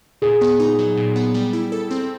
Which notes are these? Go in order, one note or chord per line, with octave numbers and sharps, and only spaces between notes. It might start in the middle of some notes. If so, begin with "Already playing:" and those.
A#2 G#4
B3
D#4
F#3
A#2
B3
G3
E4
A4
C4